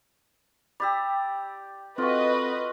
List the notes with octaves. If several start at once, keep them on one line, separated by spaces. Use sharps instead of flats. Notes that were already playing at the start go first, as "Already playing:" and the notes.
G4 D5 B5 E6
C4 F4 F#4 A4 B4 D#5